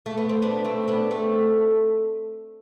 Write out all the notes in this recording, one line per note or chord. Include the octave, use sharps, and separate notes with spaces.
A3
B3
C4
B3 D4
A3 C4
B3 D4
A3 C4